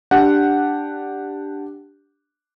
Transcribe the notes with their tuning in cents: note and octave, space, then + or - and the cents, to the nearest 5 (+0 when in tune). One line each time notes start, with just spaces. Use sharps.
D4 +0 G4 +0 F#5 +0